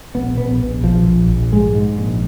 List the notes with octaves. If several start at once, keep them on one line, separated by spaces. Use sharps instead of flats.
A#1 B3
A#1 B3
A#1
A#1 F3
A#1
A#1
G#2 G#3
G#2
A#1